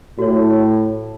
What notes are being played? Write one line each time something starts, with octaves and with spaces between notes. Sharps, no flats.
A2 F#4 C#5